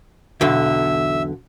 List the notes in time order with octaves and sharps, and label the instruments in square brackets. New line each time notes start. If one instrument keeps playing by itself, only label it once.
[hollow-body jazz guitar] B1 E2 D3 [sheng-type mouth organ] E5